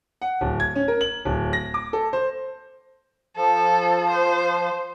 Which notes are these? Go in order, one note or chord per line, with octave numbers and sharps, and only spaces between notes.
F#5
D1
G#6
C#4
A#4
F#7
D1
A#6
D6
A4
C5
F3 A4
C5